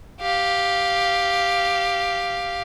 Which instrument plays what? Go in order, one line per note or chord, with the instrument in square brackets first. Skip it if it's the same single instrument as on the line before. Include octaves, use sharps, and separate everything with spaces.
[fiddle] G4 F5